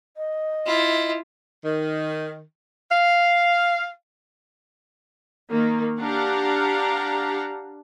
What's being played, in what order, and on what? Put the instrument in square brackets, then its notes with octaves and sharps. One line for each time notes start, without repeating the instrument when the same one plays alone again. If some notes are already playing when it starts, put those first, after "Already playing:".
[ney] D#5
[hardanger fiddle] E4 F4
[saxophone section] D#3
F5
[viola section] D#3 A#3
D4 G4 F5 F#5 A#5